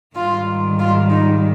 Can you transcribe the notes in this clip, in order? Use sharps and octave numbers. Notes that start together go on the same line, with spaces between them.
G#2 D#3 G3 F4
F4
D#4